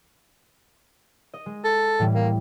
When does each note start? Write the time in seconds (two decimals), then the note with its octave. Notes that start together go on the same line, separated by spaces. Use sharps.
1.34 D#5
1.46 G#3
1.65 A4
1.99 A2 E3 G3
2.14 A#3